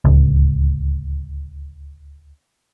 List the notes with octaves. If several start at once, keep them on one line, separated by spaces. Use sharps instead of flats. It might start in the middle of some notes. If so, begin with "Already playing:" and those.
D1 C#2